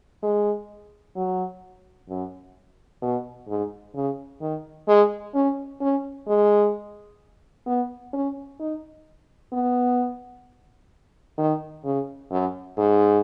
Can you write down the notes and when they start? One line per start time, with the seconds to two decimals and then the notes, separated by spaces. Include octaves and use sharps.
0.23 G#3
1.16 F#3
2.09 F#2
3.02 B2
3.48 G#2
3.95 C#3
4.41 D#3
4.88 G#3
5.34 C#4
5.81 C#4
6.27 G#3
7.66 B3
8.13 C#4
8.60 D#4
9.52 B3
11.38 D#3
11.85 C#3
12.31 F#2
12.78 G#2